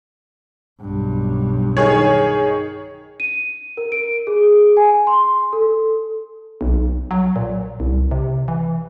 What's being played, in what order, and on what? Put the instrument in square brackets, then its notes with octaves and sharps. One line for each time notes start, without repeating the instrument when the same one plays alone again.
[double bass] B1 G2
[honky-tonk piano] D#3 G#4 C#5
[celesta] D#7
A#4
D7
G#4
G#5
C6
A4
[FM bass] B1
F#3
A#2
C2
C3
E3